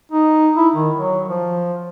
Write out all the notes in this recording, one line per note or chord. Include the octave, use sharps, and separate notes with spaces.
D#4
E4
D#3
F#3
F3